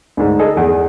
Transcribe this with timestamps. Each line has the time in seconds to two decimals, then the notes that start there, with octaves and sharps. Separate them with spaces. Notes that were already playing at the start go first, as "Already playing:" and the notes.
0.17 D2 G#2
0.39 G#4 A4 D#5
0.57 E2